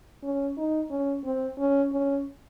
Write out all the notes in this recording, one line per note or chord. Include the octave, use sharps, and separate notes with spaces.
C#4
D#4
C#4
C4
C#4
C#4